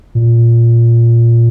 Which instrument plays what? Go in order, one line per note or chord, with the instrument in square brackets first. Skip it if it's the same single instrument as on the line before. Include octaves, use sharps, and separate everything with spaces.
[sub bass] A#2